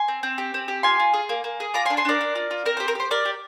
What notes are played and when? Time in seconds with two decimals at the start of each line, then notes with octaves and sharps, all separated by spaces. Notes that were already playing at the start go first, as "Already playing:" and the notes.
Already playing: G#5 C6
0.08 C4
0.23 C4
0.38 G4
0.54 C4
0.68 G4
0.83 F4 G#5 C6
1.00 F4
1.13 G#4
1.29 A#3
1.44 A#3
1.60 G#4
1.74 F4 A#5 D6
1.85 G#5 C6
1.90 D4
1.97 G#5 C6
2.05 D4 A#4 D5
2.21 D4
2.35 F4
2.51 F4
2.65 C4 A#4
2.77 G4 C5
2.88 A#4
2.95 G4 C5
3.11 G4 A#4 D5
3.25 G4